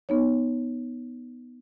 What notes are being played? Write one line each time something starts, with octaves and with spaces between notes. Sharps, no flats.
B3 D#4 C#5